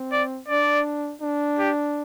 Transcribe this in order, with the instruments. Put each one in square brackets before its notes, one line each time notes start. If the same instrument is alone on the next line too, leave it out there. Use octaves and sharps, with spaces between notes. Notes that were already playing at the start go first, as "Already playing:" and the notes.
Already playing: [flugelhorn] C4
[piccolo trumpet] D5
[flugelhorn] D4 [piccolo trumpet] D5
[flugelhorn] D4
[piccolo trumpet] G4